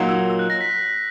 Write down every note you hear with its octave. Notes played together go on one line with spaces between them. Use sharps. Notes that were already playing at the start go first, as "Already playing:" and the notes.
Already playing: A#2 F#3 A#3 D#4
E6
E6
F#6
A#6
B6